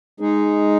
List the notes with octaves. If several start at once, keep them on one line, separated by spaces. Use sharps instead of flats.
G#3 D#4 G#4